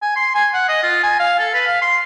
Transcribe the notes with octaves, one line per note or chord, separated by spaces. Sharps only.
G#5
C6
G#5
F#5
D#5
F4
G#5
F5
A4
B4
F5
C6